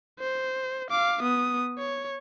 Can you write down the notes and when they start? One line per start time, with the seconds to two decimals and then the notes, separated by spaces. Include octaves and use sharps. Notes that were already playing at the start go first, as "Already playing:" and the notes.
0.19 C5
0.90 F5 D6
1.22 B3 D#6
1.79 C#5